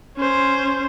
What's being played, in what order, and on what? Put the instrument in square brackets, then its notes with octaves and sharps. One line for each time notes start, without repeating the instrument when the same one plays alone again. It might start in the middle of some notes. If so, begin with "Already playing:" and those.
[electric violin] C#4 C5